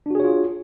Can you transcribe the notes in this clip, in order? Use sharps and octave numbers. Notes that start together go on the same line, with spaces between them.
D4 F4 F#4 G#4 C#5